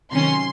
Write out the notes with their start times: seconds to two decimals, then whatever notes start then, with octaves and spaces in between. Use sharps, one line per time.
0.11 C3 D#3 F#3 C#4 C6